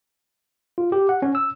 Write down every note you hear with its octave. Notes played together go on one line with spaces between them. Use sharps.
F4
G4
F#5
C#4
E6